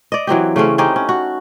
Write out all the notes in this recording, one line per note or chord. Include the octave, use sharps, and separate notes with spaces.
D5 D#5
E3 F#3 C4 G4
C#3 A3 C4 C#4
C4 C#4 D#4 G4
C#4
F#4